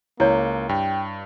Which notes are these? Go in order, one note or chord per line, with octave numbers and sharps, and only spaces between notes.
C#2 A#3 E4 C#5
G2 G5